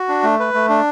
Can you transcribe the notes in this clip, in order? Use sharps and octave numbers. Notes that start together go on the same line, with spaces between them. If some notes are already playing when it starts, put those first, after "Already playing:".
Already playing: F#4
D4
A3
B4
A3
D4